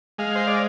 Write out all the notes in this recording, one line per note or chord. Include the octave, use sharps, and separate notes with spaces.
G#3 F5
C5
D5